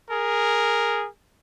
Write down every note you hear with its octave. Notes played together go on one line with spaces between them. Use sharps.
G#4 A#4